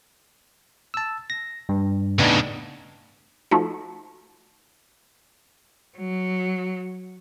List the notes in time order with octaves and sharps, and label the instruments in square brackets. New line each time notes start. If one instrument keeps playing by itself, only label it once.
[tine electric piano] A5 E6
A#6
G2
[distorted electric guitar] A2 C#3 [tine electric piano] B3 D4 D#4
[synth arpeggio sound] F3 A3 D#4 F#4
[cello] F#3